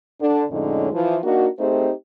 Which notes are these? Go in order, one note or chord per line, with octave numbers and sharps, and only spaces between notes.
D3 D4
F2 A2 D3 G#3 C#4 D#4
E3 F3
A#3 D4 D#4 F#4
A3 C4 D#4 G4 G#4 C5